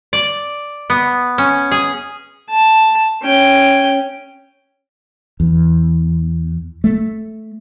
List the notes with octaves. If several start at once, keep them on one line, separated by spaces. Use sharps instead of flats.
D5
B3
C#4
G#4
A5
C#4 G5
E2
A3